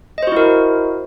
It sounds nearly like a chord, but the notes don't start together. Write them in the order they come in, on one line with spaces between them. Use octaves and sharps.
D#5 C5 F#4 E4 A#4